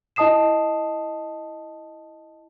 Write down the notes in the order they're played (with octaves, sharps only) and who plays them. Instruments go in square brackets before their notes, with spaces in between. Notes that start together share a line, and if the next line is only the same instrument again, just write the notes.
[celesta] E4 D#5 A5 D#6 C7 E7